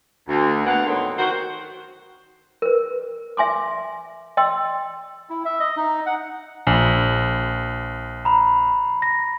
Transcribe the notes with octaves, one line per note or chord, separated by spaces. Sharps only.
D2
A#3 B3 G#4 F5 F#5
G#2 D3 D#3 F#3 B3 C4
D#3 F#4 C5
A#4 B4
E5 G#5 C6 D6
D#5 G5 C6 E6
E4
E5
D#5
D#4
F#5
A#1 G#5 F#7
A#5 B5
A#6